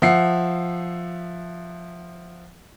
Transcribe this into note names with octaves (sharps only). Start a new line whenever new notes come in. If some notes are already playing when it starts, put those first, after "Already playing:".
F3 E5 F#5 C7